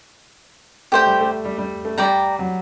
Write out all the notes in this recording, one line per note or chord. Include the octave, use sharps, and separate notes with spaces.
A3 G4 C5 G5
G3
A3
G3
G3
A3
G3 D5 G5 A#5
F#3